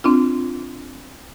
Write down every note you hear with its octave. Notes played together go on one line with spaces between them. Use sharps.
C4 D4 F4